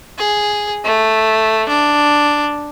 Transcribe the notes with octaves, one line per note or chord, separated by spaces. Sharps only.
G#4
A3
D4